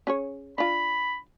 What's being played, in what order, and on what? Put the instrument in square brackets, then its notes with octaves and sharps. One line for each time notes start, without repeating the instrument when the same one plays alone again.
[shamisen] C#4 G#4 C#5
[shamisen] D4 F4 [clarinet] B5